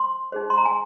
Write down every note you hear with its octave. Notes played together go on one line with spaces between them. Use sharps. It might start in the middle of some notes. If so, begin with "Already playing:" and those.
Already playing: C5 C6
D#4 G#4 C5
C6
A#5
G#5